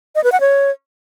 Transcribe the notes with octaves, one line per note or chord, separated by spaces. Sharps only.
D#5
B4
F#5
C#5